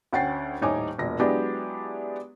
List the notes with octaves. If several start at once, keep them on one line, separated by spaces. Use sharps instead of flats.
D2 C#4 F#5 G5 A6 C7
D#1 A2 D#4 C#5 G#5 D6
E1 A#2 A#6
F#3 G#3 B3 D4 E4 G4